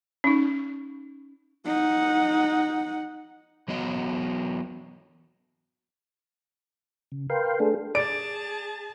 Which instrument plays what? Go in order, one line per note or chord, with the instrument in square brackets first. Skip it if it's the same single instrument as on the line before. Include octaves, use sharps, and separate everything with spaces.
[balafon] C#4 D#4
[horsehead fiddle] D#4 F#5
[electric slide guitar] E3 F#3 B3 D#5
[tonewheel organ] C#3
A#4 B4 F5 G5 C6
A3 D4 G#4 A4
[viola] G#4 A5 [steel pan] D5 [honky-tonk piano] D7